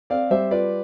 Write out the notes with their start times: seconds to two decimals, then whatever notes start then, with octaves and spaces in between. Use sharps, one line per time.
0.10 C4 D5 F5
0.31 G3 C5 E5
0.51 F4 B4 D5